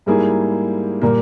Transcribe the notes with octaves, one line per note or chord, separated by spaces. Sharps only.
G#2 G3 A#3 E4 G#4
A#2 G3 A#3